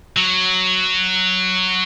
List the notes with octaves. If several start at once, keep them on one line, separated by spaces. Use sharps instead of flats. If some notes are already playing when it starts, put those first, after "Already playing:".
F#3